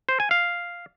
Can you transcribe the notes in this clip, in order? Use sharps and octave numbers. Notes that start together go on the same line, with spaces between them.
C5
G#5
F5